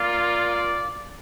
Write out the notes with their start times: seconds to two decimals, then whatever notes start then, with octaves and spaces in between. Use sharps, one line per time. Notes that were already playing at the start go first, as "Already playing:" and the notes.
Already playing: A#3 F4 D5